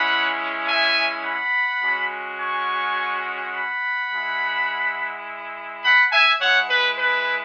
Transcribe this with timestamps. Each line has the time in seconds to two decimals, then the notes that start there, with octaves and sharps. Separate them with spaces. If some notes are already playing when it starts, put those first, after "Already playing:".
Already playing: G#3 C#4 E4 F#5 B5
0.68 E5 G#5
1.25 F#5 B5
1.82 G#3 C#4 F#4
2.40 G#5 C#6
3.54 F#5 B5
4.12 G#3 E4
5.84 F#5 B5
6.12 E5 G#5
6.40 G#3 E4 C#5 F#5
6.69 B4
6.98 B4